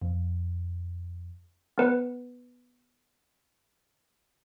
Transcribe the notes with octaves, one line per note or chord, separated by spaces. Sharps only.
F2
B3 B4